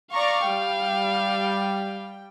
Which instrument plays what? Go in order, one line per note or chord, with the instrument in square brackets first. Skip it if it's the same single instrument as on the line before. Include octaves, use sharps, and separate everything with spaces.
[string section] D5 A#5 C#6 [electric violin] F5
[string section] G3 G5